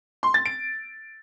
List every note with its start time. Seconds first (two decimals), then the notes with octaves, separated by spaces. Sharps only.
0.23 C6
0.34 A6
0.46 D7